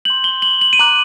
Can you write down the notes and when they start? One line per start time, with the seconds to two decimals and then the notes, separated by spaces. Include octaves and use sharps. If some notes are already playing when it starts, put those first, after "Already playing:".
0.05 C6 G6 F#7
0.24 G7
0.42 F#7
0.61 F#7
0.73 D#7
0.79 A#5 D6 F#6 F#7